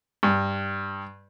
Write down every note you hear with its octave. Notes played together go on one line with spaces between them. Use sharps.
G2